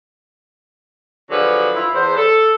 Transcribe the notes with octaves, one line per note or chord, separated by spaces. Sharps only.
D3 F3 F#3 G#4 B4
E4 F4
E2 C5
A4